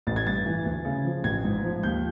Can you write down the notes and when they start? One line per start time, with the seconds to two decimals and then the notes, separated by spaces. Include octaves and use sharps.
0.07 A1 A6
0.16 G#6
0.27 G2 A6
0.46 E3
0.65 D2
0.85 C#3
1.05 F3
1.24 A1 G#6
1.44 G#2
1.64 F3
1.83 D#2 G6